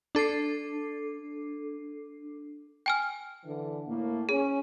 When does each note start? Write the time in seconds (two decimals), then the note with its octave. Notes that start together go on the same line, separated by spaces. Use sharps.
0.15 D4 A4 D6 C7
2.86 G5 G#5 F6
3.45 D3 E3
3.87 A2 A#3
4.29 C#4 G#4